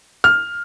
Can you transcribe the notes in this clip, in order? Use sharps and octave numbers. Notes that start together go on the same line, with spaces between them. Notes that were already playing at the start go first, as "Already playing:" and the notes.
F6